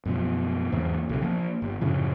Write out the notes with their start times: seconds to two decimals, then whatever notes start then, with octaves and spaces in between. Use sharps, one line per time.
0.05 F#2 B2 F3
0.72 E2 G#2 E3 A#3
1.09 B1 C3
1.22 F3 A#3
1.62 G1
1.81 F#2 A2 C#3 F3